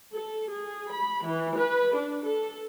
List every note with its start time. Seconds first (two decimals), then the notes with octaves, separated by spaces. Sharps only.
0.13 A4
0.51 G#4
0.90 B5
1.25 E3
1.58 B4
1.95 D4
2.24 A4